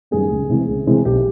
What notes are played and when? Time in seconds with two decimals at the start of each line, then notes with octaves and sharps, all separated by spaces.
0.11 F#2 D#3 G3 B3 G#4
0.31 C#2
0.49 C3 E3 G#3 C4
0.68 C#2
0.87 C3 E3 G#3 C4
1.05 B1 G4